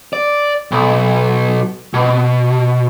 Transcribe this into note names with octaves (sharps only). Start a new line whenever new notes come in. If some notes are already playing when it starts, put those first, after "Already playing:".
D5
B1
B2